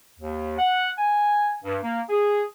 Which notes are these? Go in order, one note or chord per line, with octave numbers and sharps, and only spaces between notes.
D#2
F#5
G#5
G2
A#3
G#4